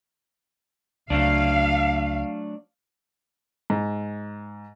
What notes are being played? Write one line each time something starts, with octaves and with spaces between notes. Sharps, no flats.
C#2 F#3 A3 D4 F5
G#2